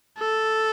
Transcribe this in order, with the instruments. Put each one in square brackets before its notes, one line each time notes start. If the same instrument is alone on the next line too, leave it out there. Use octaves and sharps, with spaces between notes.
[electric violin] A4